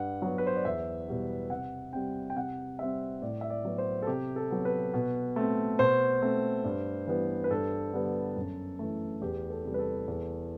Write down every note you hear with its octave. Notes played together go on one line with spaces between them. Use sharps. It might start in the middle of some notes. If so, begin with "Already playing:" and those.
Already playing: G2 F#5
F#3 B3
B4
C5
D5
E2 E5
B2 G3 B3
C3 F#5
G3 C4 G5
G5
C3 F#5
G3 C4 E5
A2 D5
E5
D5
F#3 B3
C5
A4
C3 G4
A4
F#3 B3
B4
B2
A3 C4
B2 C5
A3 C4
G2
E3 G3 B3
B4
G2 A4
D3 G3 B3
F#2
E3 A3
E2 G4
A4
C3 G3
B4
A4
E2